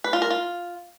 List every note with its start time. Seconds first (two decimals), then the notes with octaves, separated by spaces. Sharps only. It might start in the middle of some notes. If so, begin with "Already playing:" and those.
0.04 B4
0.13 F4
0.22 A#4
0.30 F4